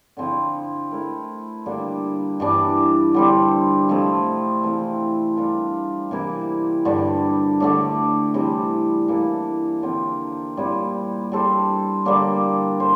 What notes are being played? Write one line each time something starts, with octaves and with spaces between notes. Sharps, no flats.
D3 F3 C4 E4
A3 E4 A#4
D3 G3 A#3 D4
G2 E3 G3 D4
D3 G3 C4
C3 F3 A3 E4
E3 A3 C4 F4
G3 D4 F4 A#4
C3 E3 A#3 E4
G2 D3 G3 D4
D3 A3 D4
C3 E3 G3
E3 A#3 D4 A4
D3 F3 C4 F4
A#2 G3 C4 E4
G3 D4 A4 C5
D3 G3 A#3 D4
A4 C5